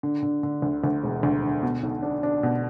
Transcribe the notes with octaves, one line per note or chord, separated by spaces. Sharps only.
D3
D3
D3
D2
D2
E1
D2
D3
B2
B1
D4
D4
B2